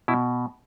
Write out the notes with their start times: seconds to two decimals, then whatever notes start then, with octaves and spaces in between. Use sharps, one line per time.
0.08 B2 E4